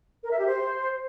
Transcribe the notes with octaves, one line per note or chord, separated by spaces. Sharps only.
A#4
E5
G4
C5